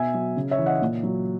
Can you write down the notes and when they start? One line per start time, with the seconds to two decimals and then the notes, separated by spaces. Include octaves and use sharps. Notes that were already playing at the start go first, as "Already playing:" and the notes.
Already playing: B2 E5 G#5
0.14 F#3
0.37 C#3
0.51 C#5 E5
0.58 E3
0.66 D#5 F#5
0.82 A#2
1.03 F#3